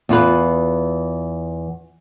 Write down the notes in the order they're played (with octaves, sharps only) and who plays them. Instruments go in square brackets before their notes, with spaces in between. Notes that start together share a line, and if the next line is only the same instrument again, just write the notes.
[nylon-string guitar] E2 F4 B4